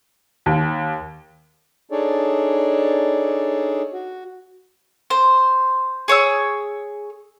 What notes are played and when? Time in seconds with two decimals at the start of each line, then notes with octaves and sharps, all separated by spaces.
0.46 D#2
1.92 D4 D#4 G#4 A4 C#5 D5
3.93 F#4
5.10 C5
6.08 G#4 C#5 D#6 E6